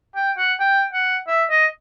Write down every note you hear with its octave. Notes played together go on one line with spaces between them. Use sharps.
G5
F#5
G5
F#5
E5
D#5